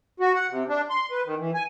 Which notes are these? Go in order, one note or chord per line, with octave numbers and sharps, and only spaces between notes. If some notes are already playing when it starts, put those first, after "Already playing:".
F#4
F#5
C3
D4
C6
B4
D#3
E3
G#5